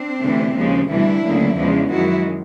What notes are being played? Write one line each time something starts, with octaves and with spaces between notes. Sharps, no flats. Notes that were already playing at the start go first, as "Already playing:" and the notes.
Already playing: C4 D4
D2 C3 E3 A3
D#2 C#3 F3 G#3
D2 C3 E3 G3 D4 E4
D2 C#3 F#3 A#3
E2 C#3 F3 G#3
F#2 D#3 G#3 E4 F#4